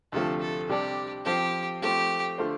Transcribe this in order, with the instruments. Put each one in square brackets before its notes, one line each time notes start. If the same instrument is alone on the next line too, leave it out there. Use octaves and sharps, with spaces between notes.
[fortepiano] D2 C3 F3 A3 F4 [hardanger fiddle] A4
[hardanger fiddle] A4
[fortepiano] C3 G3 D4 A4 D5 [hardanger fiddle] G4
[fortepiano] F3 C4 A4 C5 [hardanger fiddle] G4
[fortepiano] F3 A3 C4 [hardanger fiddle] G4
[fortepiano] D3 A3 F4 C5